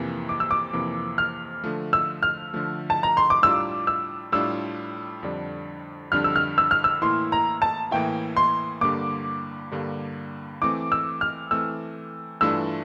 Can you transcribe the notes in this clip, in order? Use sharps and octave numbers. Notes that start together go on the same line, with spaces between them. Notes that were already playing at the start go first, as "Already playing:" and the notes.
Already playing: F2 C3 E3 A#3
D6
E6
D6
F2 C3 E3 A#3
F6
D3 F3 A3
E6
F6
D3 F3 A3
A5
A#5
C6
D6
A2 G3 D4 F4 E6
E6
A2 G3 D4 F4 E6
F2 D3 G3 D4
F2 D3 G3 D4 F6
E6
F6
E6
F6
E6
A2 E3 A#3 E4 C6
A#5
A5
A2 E3 A#3 E4 G5
C6
G2 D3 G3 A#3 D6
G2 D3 G3 A#3
E3 A3 C4 D6
E6
F6
E3 A3 C4 E6
G2 E3 A3 D4 F4 E6